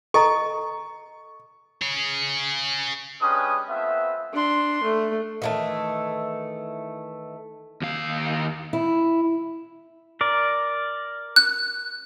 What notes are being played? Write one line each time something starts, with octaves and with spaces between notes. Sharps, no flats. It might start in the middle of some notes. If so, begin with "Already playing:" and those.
A4 D#5 A#5 C#6
G#4 C#5
G#3 C#4 D4 G4 B4 D#6
A3 B3 C4 F4 E5
D4 C6
A3
D#3 E3 A3
D#2 F5
E4
A#4 D5
F#6